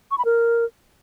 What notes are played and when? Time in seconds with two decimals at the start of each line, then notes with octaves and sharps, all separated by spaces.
0.11 C#6
0.18 B5
0.25 A#4